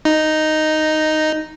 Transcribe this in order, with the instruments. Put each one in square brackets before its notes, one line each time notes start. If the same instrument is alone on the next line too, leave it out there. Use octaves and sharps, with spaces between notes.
[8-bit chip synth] D#4